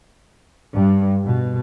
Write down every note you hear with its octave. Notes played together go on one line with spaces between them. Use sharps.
G2
B2